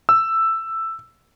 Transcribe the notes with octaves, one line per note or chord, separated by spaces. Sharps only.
E6